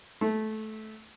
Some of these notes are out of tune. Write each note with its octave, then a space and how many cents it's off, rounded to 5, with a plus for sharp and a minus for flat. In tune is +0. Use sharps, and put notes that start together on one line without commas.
A3 -15